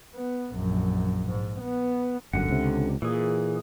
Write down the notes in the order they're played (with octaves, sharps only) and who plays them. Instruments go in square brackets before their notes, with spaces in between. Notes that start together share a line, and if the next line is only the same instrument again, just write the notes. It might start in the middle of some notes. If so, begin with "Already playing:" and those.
[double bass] B3
A#1 F#2
G#2
B3
[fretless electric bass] G1 F#2 [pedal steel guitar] D3 F#5
[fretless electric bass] C#2 C3
[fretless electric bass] A#2 [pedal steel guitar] E3 G#4